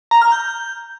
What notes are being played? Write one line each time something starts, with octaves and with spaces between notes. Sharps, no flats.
A#5
F6
G6